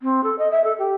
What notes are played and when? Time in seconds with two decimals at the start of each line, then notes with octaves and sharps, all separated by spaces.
0.02 C4
0.24 A4
0.39 D#5
0.51 E5
0.64 A4
0.78 G4